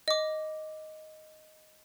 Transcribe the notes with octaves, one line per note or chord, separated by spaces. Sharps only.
D#5 D6